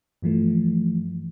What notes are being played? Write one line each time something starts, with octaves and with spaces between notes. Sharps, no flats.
G2 E3 F3 A3